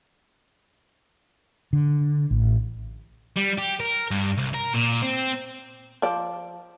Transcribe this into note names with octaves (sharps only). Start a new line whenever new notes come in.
D3
A1
G3
G4
A#4
G2
C2
A#4
A#2
C4
F3 D5